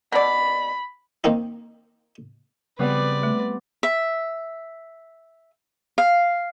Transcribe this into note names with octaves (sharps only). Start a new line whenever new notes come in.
B2 D5 B5
D#3 A#3 C4 D#4
C#3 G3 B3 C4 B4 D5
A3
E5
F5